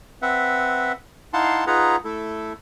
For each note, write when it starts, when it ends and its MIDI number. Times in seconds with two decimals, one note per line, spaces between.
0.22 0.92 60
0.22 0.92 71
0.22 0.92 76
0.22 0.92 78
1.33 1.65 63
1.33 1.65 64
1.33 1.65 77
1.33 1.65 78
1.33 1.65 81
1.33 1.65 84
1.67 1.96 63
1.67 1.96 65
1.67 1.96 68
1.67 1.96 71
1.67 1.96 78
1.67 1.96 82
2.04 2.53 57
2.04 2.53 64
2.04 2.53 69